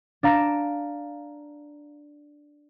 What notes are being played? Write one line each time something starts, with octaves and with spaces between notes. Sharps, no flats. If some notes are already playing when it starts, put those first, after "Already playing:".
D4 F5 A#5 A#6 D7 E7